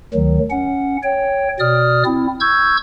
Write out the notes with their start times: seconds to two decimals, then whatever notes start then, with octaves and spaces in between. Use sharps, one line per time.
0.14 D2 D#3 F#3
0.50 C#4 F#5
1.03 C#5 G5
1.60 B2 D5 D#6 F6
2.05 C4 E4
2.40 C#6 E6 G6 G#6